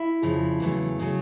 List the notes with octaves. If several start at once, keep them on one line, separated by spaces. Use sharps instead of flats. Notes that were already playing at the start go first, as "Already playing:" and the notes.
Already playing: E4
F2 C#3 F3
E2 C#3 F#3 A3
C#3 F#3 A3